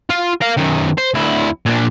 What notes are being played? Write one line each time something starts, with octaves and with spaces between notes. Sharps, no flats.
F4
A#4 F5
F#2 D#3
C5
D2 E4
A#2 D4